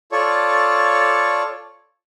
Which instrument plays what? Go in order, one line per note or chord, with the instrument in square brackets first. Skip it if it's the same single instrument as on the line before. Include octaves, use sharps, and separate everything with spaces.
[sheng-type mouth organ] F4 A4 C#5 D5 C#6